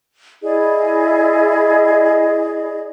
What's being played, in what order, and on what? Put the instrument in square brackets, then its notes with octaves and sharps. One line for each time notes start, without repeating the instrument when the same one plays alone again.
[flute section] E4 G#4 D5 D#5